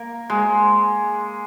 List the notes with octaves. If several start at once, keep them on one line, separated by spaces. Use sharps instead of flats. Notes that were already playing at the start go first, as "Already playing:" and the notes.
Already playing: A#3
G#3